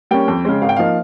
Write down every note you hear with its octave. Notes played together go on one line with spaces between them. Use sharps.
G3 A#3 C#4 G5
F2
C#3 G#3
G#1 F5
G5
F3 A#3 D#4 F5